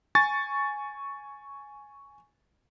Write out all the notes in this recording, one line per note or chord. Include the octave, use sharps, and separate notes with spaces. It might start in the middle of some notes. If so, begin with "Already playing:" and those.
G#5 C#6 A6